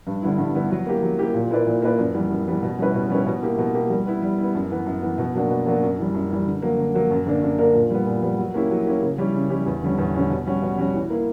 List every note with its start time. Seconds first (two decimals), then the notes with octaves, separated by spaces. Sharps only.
0.07 G2
0.22 D3 G3 B3 E4
0.38 G2
0.54 D3 G3 B3 E4
0.70 F#3
0.86 A#3 E4 G4
1.03 F#3
1.19 A#3 E4 G4
1.34 A#2
1.51 A#3 E4 B4 D5
1.66 A#2
1.82 A#3 E4 B4 D5
1.98 F#2
2.14 E3 G3 B3
2.30 F#2
2.46 E3 G3 B3
2.63 B2
2.79 G3 C#4 E4 B4
2.94 B2
3.10 G3 C#4 E4 B4
3.26 B2
3.43 A#3 E4 G4
3.58 B2
3.75 A#3 E4 G4
3.90 G3
4.06 B3 E4
4.22 G3
4.38 B3 E4
4.55 F#2
4.70 E3 B3
4.86 F#2
5.02 E3 B3
5.18 B2
5.34 F#3 A#3 D4 F#4
5.50 B2
5.66 F#3 A#3 D4 F#4
5.83 F#2
5.98 E3 G3
6.14 F#2
6.30 E3 G3
6.47 D3
6.62 F#3 A#3
6.78 D3
6.94 F#3 A#3
7.11 F#2
7.26 D3 A#3 D4 A#4
7.42 F#2
7.58 D3 A#3 D4 A#4
7.74 A#2
7.90 G3 B3
8.06 A#2
8.22 G3 B3
8.38 F#3
8.54 A#3 C#4 E4 G4
8.71 F#3
8.86 A#3 C#4 E4 G4
9.02 C#3
9.18 G3 C#4 E4 G4
9.34 C#3
9.50 G3 C#4 E4 G4
9.66 E2
9.82 D3 G3 C#4
9.98 E2
10.14 D3 G3 C#4
10.30 B2
10.47 G3 C#4 F#4
10.62 B2
10.78 G3 C#4 F#4
10.94 E3
11.10 A#3 E4